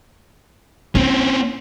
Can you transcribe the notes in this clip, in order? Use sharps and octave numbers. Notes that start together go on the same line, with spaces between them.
C4 C#4 E4